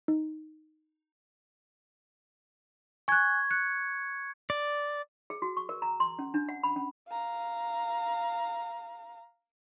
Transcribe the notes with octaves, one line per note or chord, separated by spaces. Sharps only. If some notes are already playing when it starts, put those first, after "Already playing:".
D#4
G#5 C#6 F#6 G#6
F#6 C#7
D5
G#4
F#4
C#6
A#4
A#5
C6
C#4
D4
F#5
B5
C#4
F5 A#5